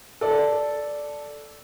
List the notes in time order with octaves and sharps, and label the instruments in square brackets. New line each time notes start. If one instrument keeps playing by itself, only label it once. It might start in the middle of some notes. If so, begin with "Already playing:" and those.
[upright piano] A4 D5